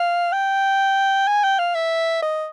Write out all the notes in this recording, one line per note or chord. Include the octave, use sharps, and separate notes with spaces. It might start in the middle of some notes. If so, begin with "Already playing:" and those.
Already playing: F5
G5
G#5
G5
F5
E5
D#5